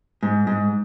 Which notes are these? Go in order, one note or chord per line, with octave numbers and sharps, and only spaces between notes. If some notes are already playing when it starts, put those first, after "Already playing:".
G#2
G#2